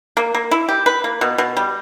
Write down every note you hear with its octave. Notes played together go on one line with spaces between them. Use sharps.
A#3
A#3
E4
G4
B4
A#3
B2
B2
G3